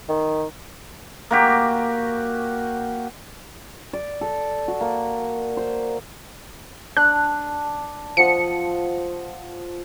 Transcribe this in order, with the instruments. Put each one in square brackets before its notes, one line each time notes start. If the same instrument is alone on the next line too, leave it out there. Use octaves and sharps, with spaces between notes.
[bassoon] D#3
[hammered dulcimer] A#3 F#4 G4
D5
A4
F#4
A#3
C5
[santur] D4 [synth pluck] F#6
[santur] F3 F#5 D#6 [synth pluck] C#7